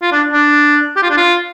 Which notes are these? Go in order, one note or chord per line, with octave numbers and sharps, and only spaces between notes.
F4
D4
D4
G4
F4
D4
F4